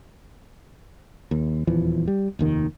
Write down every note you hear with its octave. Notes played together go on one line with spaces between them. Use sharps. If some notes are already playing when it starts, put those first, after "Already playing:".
D#2
D#1 E2 E3 F3
G3
F1 D#2 D#3